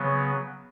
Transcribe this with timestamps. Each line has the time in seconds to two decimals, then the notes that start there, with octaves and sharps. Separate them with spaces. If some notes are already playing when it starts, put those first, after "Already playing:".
Already playing: C#3 F#3 B3